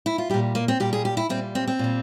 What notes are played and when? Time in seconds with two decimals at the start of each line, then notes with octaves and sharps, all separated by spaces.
0.06 E4
0.18 F4
0.30 A#2 G3 G4
0.55 A#3
0.68 C4
0.80 A#2 G3 G4
0.93 G#4
1.05 G4
1.17 E4
1.29 A#2 G3 C4
1.55 C4
1.68 C4
1.79 A#2 G3